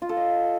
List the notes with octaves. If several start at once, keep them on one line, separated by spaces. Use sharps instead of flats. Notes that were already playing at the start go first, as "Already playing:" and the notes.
F4
A4
D#5